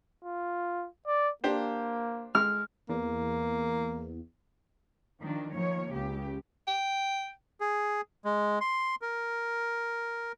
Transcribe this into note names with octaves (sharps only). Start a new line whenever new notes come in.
F4
D5
A#3 D4 G4 C5
G#3 F6
E2 A#3
D#3 F3 D4
D#3 F3 A#3 C#5
C#2 C#3 G4
G5
G#4
G#3
C6
A#4